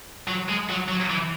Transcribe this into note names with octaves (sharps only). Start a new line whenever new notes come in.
F#3
G#3
F#3
F#3
E3